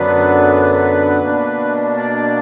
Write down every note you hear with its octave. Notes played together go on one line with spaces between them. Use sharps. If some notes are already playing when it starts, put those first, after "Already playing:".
Already playing: F#2 D3 F#3 B3 D4 B4
B2 A#3 D4
D5